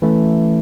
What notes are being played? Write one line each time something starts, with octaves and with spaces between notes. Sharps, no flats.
E3 A3 C#4 E4